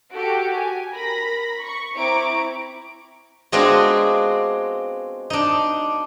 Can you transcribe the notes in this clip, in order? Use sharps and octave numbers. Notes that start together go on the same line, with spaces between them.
F#4 G4 A4 D7
G#5
A#4 B5 A#6
C#6
C4 E4 A#5 C#6 D6 D7
G#3 B3 C4 D4 F4 F#4
D4 D#4